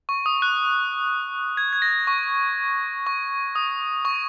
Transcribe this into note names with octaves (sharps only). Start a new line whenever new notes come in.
C#6
D#6
F#6
G#6
G#6
A#6
C#6
C#6
D#6
C#6